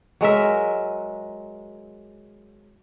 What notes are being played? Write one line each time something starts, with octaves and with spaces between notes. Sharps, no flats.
F#3 G#3 A#4 E5